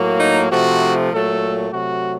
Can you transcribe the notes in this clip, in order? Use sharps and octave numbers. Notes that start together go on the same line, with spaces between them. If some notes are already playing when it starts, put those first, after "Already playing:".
Already playing: A2 F#3 A#3
D#4
C3 F3 A3 F#4
A#2 F#3 A3 A4
C3 F#3 A3 F#4